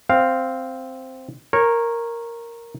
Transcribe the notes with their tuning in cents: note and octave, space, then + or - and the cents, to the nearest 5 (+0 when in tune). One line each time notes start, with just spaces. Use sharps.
C4 +0 F5 +0
A#4 +0 C#5 -20